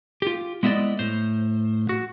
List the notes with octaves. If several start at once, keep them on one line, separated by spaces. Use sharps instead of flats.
F4 G4
G#3 B3 E4 F4 D5 D#5
A2 C5
F#4